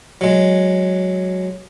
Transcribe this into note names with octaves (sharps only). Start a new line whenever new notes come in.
F#3 G#3